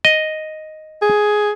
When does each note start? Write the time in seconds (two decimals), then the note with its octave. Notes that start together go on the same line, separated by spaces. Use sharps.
0.05 D#5
1.02 G#4